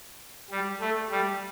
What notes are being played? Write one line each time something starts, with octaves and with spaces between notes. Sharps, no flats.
G3
A3
G3